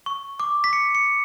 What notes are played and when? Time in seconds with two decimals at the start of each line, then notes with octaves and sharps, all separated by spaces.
0.06 C#6
0.40 D6
0.64 B6
0.73 C#7
0.95 C#7